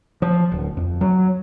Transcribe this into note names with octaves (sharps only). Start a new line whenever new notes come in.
F3
D1
F2
F#3